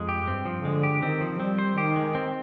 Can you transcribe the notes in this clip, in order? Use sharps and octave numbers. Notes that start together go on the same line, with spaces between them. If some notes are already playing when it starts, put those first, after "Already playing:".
Already playing: F2 G#3
G4
G2 C4
F3
D3 G#3
G4
D#3 C4
F3
G3 C4
C5
D#3 G4
G#3
C4